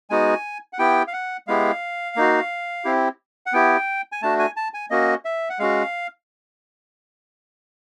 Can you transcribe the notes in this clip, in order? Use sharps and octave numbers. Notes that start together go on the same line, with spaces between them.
G#3 B3 D#4 F#4 G#5
F#5
B3 E4 G4 G5
F5
F#5
G#3 B3 E4 G4 F5
A#3 D#4 F#4
C4 E4 G4
F#5
B3 E4 G4 G5
G#5
A3 D4 F#4 A5
G#5
A5
G#5
A#3 C#4 F#4 D#5
E5
F#5
G#3 C#4 F#4 F5